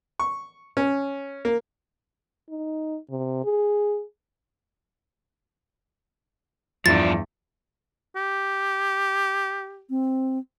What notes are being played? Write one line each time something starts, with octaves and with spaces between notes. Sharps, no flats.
C#6
C#4
A#3
D#4
C3
G#4
E2 G2 F3 D4 A6
G4
C4